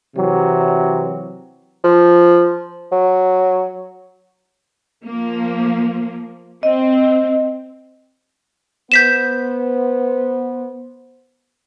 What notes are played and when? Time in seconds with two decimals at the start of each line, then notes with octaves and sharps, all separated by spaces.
0.15 C3 E3 F#3
1.84 F3
2.92 F#3
5.03 F3 A#3
6.63 C4 D#5
8.92 B3 C5 G6 B6 E7